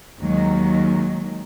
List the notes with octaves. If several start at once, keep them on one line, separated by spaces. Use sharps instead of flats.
D#2 D#3 F#3 G#3